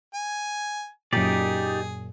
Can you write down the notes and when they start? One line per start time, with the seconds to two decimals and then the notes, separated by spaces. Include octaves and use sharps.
0.14 G#5
1.13 F#2 A#2 D#4 G4 G#4 D5